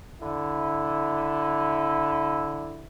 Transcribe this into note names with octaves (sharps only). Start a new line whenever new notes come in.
D3 E4